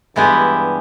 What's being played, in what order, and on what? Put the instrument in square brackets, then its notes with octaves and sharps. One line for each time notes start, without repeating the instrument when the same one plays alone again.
[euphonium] G2 [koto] E3 G#3 B3 E4 G4